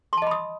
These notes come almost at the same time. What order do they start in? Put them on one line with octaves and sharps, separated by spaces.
C6 A5 D#5 B5 D#6